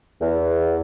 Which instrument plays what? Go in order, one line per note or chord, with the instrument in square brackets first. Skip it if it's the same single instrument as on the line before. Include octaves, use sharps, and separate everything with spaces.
[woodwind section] E2